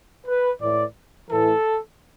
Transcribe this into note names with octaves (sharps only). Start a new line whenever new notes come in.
B4
A2 E3 D5
A2 E3 A4